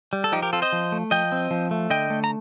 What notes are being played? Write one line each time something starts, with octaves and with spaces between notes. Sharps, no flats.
G3
A4
F3 D#4 G4
G4 A#4
C4 F4 A4
C5 D#5
F3
A3
F3 D#5 G5
C4
F3
A3
D3 D#5 G5
A3
A#5